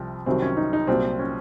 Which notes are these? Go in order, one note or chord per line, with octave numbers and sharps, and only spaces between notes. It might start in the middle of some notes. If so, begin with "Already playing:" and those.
Already playing: C2 C3 F3
C2 C3 D#3 F#3 C4
C#4
D#4
D#4
C2 A#2 F#3 C4
C#4